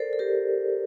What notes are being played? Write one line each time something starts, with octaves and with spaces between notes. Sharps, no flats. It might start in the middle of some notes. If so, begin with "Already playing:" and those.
Already playing: A4 A#4 C5 D5
A4
G4 A#4